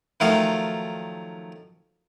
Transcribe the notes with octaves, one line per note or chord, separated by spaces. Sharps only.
D#3 F3 F#3 A3 F5 A5